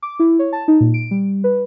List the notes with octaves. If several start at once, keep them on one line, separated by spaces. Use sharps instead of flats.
D6
E4
C#5
A5
D#4
A#2
D7
G3
B4